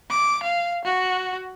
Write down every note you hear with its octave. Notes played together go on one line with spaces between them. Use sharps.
D6
F5
F#4